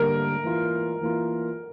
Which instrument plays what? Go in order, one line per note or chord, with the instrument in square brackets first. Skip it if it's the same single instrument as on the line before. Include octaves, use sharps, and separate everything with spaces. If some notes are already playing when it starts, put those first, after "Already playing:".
Already playing: [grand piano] D3 G3 A#3 [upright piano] A#4
[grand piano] E3 A#3 F4
E3 A#3 F4